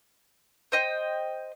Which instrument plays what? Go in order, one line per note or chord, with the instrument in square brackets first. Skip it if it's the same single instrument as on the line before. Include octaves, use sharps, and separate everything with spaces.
[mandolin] C5 D#5 G5